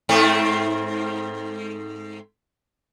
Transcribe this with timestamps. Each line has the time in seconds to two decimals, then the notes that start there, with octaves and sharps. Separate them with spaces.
0.09 G#2 A3 C4